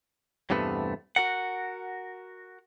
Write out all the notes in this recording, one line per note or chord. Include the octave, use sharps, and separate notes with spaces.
E2 G2 C3 A3 B3
F#4 A#4 F#5